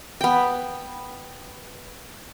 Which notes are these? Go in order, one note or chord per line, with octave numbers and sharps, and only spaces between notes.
B3 G5